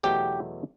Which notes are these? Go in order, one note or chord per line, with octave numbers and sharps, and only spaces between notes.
E2 B2 F#3 A3 G4